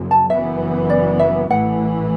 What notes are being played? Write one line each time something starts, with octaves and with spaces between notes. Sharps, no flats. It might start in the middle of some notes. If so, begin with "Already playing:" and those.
Already playing: F#1 F#2 F#3
A5
F#1 F#2 E3 B3 E5
D5
E5
A1 A2 E3 A3 F#5